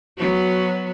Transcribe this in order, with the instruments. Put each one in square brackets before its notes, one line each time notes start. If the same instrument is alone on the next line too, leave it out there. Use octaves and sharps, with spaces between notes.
[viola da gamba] F#3 B3 F#4